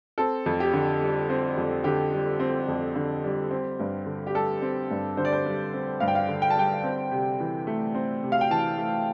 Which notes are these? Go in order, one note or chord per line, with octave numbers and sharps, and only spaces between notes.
C4 A4
F2
G4
D3
G3
C4
F2
D3 G4
G3
C4
F2
D3
G3
C4
G2
D3
G4
G3 A4
C4
G2
D3 C5
D5
C5
G3
C4
G2 F5
G5
F5
D3
G5
A5
G3 G5
C4
C3
E3
A3
C4
C3
F5
G5
E3 A5
A3